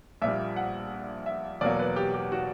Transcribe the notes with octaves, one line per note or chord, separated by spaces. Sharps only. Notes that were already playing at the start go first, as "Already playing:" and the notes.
A#1 A#2 G3 E5
F#5
E5
E2 B2 F#3 A#3 D5
B4
G4
G4
F#4